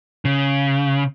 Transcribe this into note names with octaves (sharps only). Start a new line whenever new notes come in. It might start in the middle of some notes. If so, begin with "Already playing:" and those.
C#3